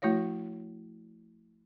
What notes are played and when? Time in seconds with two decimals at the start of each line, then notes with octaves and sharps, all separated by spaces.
0.02 F3 A3 E4 F#4 C#5 F5